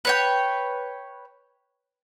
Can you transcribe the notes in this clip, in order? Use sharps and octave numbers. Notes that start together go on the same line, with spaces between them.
B4 C#5 G5